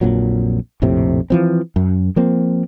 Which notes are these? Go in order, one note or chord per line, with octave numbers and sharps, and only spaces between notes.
A#1 F2 A#2 F#3
A#1 F2 A2 C3
E3 F3 C4
F#2
F3 A#3 C4